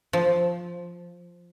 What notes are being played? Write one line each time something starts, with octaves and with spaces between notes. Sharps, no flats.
F3